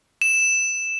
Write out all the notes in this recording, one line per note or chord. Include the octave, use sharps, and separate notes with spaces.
E7